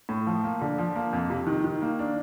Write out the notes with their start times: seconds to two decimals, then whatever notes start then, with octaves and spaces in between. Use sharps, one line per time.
0.09 A2
0.27 F3
0.44 A#3
0.61 D3
0.78 F3
0.95 A#3
1.13 F2
1.30 C3
1.47 D#3
1.64 D#3
1.82 A#3
1.99 D4